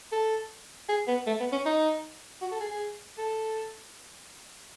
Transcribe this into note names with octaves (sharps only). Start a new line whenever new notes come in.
A4
G#4
B3
A3
B3
C#4
D#4
F#4
A4
G#4
G#4
A4